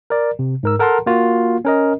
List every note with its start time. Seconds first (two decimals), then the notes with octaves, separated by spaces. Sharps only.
0.10 A#4 D5
0.39 C3
0.63 G#2 A#4 E6
0.79 A4 A#4 F#5 A5 A#5 C6
1.06 A#3 F4 F#4
1.65 C#4 A#4 D#5